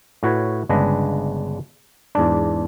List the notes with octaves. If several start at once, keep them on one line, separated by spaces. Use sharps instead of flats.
A2 F#4 B4 C#5
G1 C#3 G#3 D4 B4 D#5
E2 G#2 D4